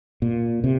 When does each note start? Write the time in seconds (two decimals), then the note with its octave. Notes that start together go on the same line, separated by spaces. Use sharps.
0.22 A#2
0.64 C3